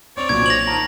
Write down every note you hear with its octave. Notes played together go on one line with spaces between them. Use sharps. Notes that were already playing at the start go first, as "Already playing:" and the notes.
C4 C#5 D5 F7
B1 A#2 F#3 G#6
C5 A#6 F7 F#7
D#3 A5 A#5